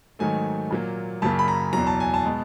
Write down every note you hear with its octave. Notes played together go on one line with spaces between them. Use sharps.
G#2 D#3 F#3 A3 G#5
A#2 F#3 A#3
F#2 C#3 F#3 A#3 A5
B5
A#5
E2 B2 F#3 A#5
A5
G#5
A5
B2 G#3